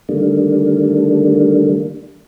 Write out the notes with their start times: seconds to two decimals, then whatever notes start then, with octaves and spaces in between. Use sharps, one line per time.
0.09 D3 D#3 G3 A3 A#3 D4